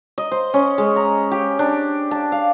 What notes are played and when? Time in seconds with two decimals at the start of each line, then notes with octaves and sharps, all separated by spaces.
0.18 D#5
0.32 C5
0.54 C#4
0.78 G#3
0.96 A#5
1.32 G4
1.59 D4
2.11 A5
2.32 F5